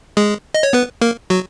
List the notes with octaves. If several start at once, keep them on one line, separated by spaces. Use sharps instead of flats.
G#3 G#4
D#5
C#5
B3 B4
A#3 A#4
F#3 F#4